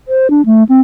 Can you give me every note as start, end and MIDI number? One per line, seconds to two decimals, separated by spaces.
0.08 0.27 72
0.30 0.42 62
0.46 0.63 57
0.69 0.80 60